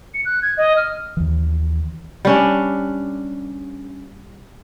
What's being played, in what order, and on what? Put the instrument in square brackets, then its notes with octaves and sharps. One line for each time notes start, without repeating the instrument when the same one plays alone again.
[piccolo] C#7
F#6
G#6
D#5
F6
[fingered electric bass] D#2 E3
[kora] G3 C#4 D4